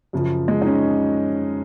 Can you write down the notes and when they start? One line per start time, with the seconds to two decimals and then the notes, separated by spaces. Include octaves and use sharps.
0.13 F#2 C#3 F3
0.48 G#3
0.62 D#4
0.66 C#4